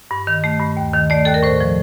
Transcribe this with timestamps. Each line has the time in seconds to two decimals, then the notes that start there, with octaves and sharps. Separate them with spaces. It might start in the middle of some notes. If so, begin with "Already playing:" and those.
0.11 G2
0.27 D#3
0.44 A3
0.60 G2
0.77 D#2
0.93 D#3
1.10 A3 D5
1.25 D#2 A4
1.34 A#4
1.43 A2 C5
1.60 F3